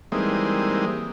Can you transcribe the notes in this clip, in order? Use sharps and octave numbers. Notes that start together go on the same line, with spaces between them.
E3 G3 G#3 A#3 C4 D#4